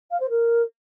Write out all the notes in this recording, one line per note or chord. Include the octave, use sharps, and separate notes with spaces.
F5
C5
A#4